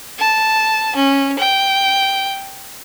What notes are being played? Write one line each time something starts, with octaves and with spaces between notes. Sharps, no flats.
A5
C#4
G5